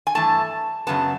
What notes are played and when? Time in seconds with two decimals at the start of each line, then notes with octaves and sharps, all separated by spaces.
0.07 G#5
0.15 G2 E3 A3 A5
0.87 F#2 C#3 F#3 B3 A5